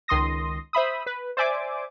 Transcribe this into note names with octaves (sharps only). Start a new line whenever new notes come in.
C#2 D#3 C6 D#6 A#6
C5 E5 B5 D#6
B4
C5 D5 E5 G#5 D6